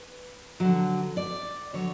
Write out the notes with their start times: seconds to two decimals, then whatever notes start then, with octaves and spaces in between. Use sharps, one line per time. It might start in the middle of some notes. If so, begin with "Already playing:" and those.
Already playing: B4
0.60 D3 F#3
1.17 D5
1.73 D3 F#3 C#5